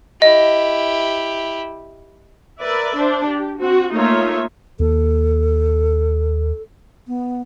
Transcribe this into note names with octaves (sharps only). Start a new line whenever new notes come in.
E4 G4 D#5
A#4 B4 D5 E5
D4 C5
G4
C4 F#4
A3 A#3 D#4 F4 C#5 E5
D#2 A#3 A4
B3